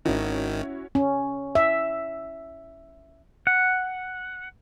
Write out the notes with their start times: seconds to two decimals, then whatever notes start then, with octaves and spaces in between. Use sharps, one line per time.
0.05 G#1 D#3 C#4 E4 F#4
0.95 C#4
1.55 E5
3.47 F#5